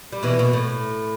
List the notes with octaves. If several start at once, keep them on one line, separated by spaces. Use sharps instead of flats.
G3
B2 E3
B2
A2